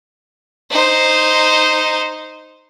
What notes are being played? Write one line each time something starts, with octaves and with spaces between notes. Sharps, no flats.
D#4 C5